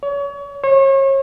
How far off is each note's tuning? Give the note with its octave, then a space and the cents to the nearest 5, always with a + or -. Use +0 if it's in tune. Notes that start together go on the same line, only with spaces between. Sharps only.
C#5 +35
C#5 -35